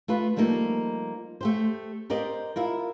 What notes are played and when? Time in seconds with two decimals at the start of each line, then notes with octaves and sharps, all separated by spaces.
0.08 A3 F4 B4
0.36 F3 G3 A3 A#3 D#4
1.41 A3 G4 C5
2.10 G4 A#4 C5 D5 D#5
2.56 E4 F4 A#4